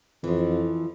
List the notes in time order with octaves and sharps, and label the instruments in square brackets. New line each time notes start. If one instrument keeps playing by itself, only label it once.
[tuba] F2 [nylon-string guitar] E3 F3